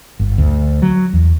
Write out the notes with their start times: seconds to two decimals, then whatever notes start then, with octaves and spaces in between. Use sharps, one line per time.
0.20 G1
0.38 D2
0.82 F#3
1.13 E2